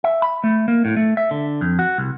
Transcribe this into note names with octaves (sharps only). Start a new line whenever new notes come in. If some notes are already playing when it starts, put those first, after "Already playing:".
E5
B5
A3
A#3
A2
A3
E5
D3
F2
F#4
C2